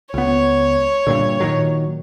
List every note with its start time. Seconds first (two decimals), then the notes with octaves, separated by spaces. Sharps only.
0.14 C#2 B3 C#5
1.07 G2 A#2 D3
1.40 A#2 D#3 F#3